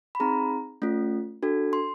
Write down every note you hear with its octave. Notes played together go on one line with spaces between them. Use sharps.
B5
C4 D#4 G#4 A#5
A3 C#4 F4
D4 F#4 A4
C6